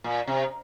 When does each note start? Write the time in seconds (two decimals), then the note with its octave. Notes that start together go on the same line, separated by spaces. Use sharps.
0.04 A#2
0.27 C3